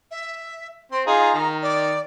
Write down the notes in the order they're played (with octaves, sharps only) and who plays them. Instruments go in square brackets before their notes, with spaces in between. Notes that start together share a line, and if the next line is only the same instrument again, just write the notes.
[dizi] E5
[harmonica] C4 [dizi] C6
[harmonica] D#4 F4 G#4 [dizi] A#5
[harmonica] D#3
[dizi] D5